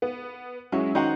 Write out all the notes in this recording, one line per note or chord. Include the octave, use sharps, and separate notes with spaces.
B3
F#3 G#3 C#4 E4
D#3 D#4 F#4 C5 F#5